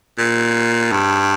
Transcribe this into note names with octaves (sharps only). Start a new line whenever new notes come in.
A#2
G2